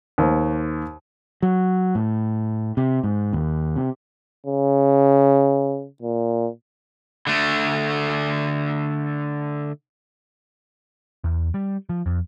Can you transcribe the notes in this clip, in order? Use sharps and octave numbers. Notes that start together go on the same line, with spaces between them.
D#2 C5
F#3
A2
C3
G#2
D#2
C3
C#3
A#2
D3 A3
E2
G3
F3
F2